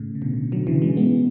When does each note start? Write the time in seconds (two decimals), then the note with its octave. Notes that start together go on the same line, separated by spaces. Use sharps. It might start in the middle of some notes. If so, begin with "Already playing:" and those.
Already playing: A2 C#3
0.15 C#3
0.22 B2 D3
0.52 D3 F#3
0.67 C#3 E3
0.82 E3 G#3
0.97 G#3 B3